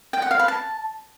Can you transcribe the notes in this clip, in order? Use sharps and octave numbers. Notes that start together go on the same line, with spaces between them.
G5
F#5
F5
B4
A5